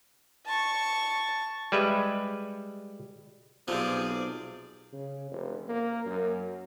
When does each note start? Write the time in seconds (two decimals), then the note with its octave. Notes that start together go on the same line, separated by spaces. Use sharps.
0.47 A5 C#6
1.72 G3 G#3 B4 E5
3.68 B1 C3 F3 G#4 D5
4.93 C#3
5.31 F1
5.68 A#3
6.06 F#2